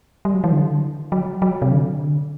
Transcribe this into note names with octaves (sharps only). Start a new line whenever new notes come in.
G3
F#3
E3
D3
F#3
F#3
C3
D3